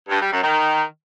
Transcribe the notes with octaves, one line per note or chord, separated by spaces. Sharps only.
G2
G3
F#2
D#3